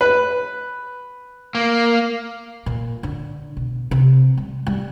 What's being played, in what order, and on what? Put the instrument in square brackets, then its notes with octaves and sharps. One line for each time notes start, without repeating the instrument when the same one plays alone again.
[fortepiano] B4
[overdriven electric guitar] A#3
[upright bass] A#2
D3
B2
C3
G3
G3